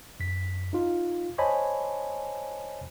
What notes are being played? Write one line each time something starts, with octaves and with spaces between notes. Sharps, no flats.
F#2 B6
D#4 F4
C5 C#5 D#5 G#5 A5 B5